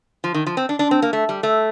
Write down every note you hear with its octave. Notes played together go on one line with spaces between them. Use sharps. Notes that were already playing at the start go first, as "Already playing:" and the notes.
F3
D#3
F3
C4
D4
D4
C4
A#3
A3
G3
A3